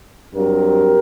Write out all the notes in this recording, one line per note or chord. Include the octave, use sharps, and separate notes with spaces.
G2 F#3 C4 G4 A#4